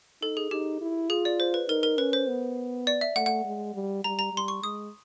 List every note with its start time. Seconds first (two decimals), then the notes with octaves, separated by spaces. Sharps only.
0.22 D#4 A4
0.37 G#4
0.51 D#4 G4
0.81 E4
1.10 F4 G#4
1.25 D5
1.40 C5
1.54 B4
1.69 D#4 A#4
1.83 A#4
1.98 C#4 B4
2.13 C5
2.28 B3
2.87 D5
3.01 E5
3.16 A3 F#5
3.26 F#5
3.45 G#3
3.75 G3
4.04 G3 A#5
4.19 A#5
4.33 G3 C6
4.48 C#6
4.63 G#3 D#6